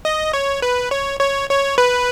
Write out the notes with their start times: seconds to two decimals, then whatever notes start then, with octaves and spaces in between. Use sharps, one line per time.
0.05 D#5
0.33 C#5
0.62 B4
0.91 C#5
1.20 C#5
1.49 C#5
1.78 B4